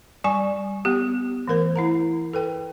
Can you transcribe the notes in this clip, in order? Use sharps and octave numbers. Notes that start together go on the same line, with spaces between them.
G3 G#5 C#6
B3 G4
E3 A3 A#4 C5
E4 F#5 A#5
A4 B4 G5